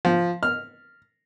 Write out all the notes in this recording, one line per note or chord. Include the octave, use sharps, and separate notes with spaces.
F3
F6